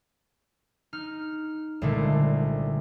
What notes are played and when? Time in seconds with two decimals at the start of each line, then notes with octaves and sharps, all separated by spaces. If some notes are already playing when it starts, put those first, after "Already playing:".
0.93 D#4 F6
1.82 C2 A#2 D3 G#3 A3